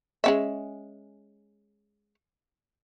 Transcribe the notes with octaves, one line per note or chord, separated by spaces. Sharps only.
G#3 C#4 E5